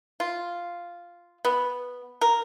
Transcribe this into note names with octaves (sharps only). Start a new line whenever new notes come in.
F4
B3
A#4